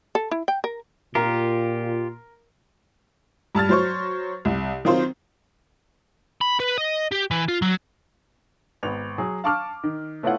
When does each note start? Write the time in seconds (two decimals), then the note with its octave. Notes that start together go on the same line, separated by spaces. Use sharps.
0.15 A4
0.31 E4
0.48 G5
0.64 A#4
1.15 A#2 F4 G4 A#4
3.55 G2 A5 F6 A6
3.69 F#3 C5 C#6
4.45 C2
4.85 D#3 F#3 C4 F4 C5
6.41 B5
6.60 B4
6.78 D#5
7.12 G4
7.31 E3
7.48 F4
7.62 F#3
8.83 G#1 B3 F7
9.18 F#3 G#4
9.44 F5 A5 C#6 D6 F6
9.83 D#3
10.23 A3 B3 E4 F4 C#5 F#5